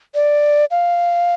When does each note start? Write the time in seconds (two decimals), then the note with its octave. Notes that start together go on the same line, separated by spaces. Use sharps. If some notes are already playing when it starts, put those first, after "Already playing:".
0.15 D5
0.71 F5